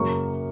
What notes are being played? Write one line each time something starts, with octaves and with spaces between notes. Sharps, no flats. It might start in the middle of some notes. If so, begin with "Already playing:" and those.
Already playing: F#2 C#3 F#3 A#3 C#6